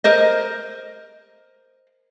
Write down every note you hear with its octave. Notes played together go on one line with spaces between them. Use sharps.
A#4 C5 D#5